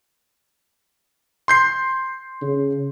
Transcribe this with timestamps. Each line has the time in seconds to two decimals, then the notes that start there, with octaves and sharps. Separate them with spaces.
1.48 C6 G6 C7
2.42 C#3